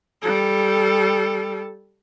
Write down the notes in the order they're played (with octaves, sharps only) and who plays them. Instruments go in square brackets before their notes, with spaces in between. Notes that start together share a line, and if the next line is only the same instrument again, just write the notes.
[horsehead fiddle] G3 A4